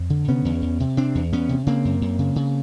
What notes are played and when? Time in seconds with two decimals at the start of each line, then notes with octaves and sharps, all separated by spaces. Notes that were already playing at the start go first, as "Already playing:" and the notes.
Already playing: F2
0.10 D3
0.28 C3 B3 C#4
0.45 E2
0.62 E2
0.80 C3
0.97 C3 C4 D4
1.15 E2
1.32 E2 B3 C#4
1.49 C3
1.66 C#3 A#3 C4
1.85 F#2
2.01 F#2
2.19 C#3
2.36 C#3